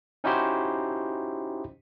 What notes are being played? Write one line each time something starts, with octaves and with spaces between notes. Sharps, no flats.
C#4 D#4 E4 F#4 G4 C5